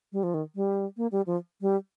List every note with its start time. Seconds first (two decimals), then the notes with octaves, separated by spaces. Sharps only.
0.12 G3
0.23 F3
0.34 D#3
0.55 G3
0.97 A#3
1.12 G3
1.27 F3
1.61 G3